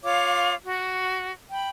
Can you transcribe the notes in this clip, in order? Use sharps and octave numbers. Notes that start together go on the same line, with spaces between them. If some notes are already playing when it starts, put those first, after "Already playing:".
F4 C#5 F5 D6
F#4
G5 B5